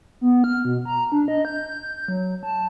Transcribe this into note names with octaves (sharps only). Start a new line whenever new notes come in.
B3
F6
B2
A#5
D4
D#5
G6
F#3
A5